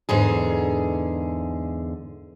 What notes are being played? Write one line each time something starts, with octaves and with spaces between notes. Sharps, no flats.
E2 G#2 D3 G#4